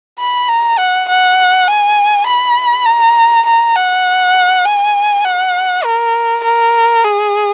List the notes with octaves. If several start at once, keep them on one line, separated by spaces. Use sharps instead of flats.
B5
A#5
F#5
F#5
G#5
B5
A#5
A#5
F#5
G#5
F#5
A#4
A#4
G#4